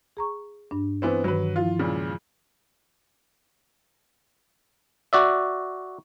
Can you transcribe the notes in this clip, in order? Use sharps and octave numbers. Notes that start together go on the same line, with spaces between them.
G#4 A#5 C#6
G2 D4
E3 B3 C4
G2 D#3 E3 F#3 B4
F3 E4 F4
C#2 A#2 C#3
F#4 D5 E5